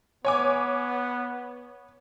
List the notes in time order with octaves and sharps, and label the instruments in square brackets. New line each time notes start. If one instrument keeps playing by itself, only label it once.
[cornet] B3 [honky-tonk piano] C#5 G#5 D6